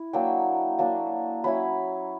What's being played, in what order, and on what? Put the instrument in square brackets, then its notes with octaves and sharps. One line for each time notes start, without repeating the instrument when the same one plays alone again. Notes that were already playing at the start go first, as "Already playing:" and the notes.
Already playing: [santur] E4
F#3 A#3 D4 G5
F#3 A#3 D4
F#3 C#4 E4 B5